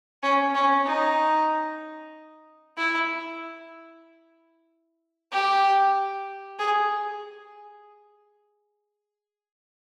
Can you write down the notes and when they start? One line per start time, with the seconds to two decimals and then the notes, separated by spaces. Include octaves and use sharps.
0.23 C#4
0.55 C#4
0.86 D#4
2.77 E4
5.32 G4
6.59 G#4